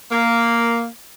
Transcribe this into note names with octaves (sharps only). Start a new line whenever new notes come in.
A#3